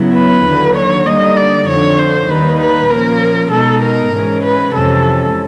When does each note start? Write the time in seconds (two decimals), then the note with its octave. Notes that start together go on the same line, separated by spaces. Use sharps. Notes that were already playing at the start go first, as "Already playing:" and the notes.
Already playing: C#3 F#3 B3 E4
0.14 B4
0.45 D#2 D3 F#3
0.76 C#5
1.06 D3 G3 A#3 D#4 D#5
1.37 D5
1.68 F2 D3 F3 C#5
1.98 C5
2.29 D#2 D#3 G3 A#3 D#4 B4
2.60 B4
2.90 A#2 F3 A#3 C#4 A#4
3.51 B2 G#3 B3 D#4 A4
3.82 A#4
4.13 G#2 E3 G#3 C#4
4.43 B4
4.74 F2 C3 E3 G#3 C#4 A4